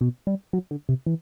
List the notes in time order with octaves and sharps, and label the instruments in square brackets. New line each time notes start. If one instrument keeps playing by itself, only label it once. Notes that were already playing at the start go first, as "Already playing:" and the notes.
[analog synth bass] B2
G3
F#3
D3
C3
E3